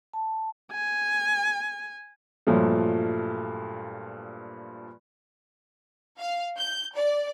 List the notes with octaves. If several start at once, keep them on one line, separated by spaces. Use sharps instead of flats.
A5
G#5
G2 A#2 F3 F#3 A3
F5
G6
D5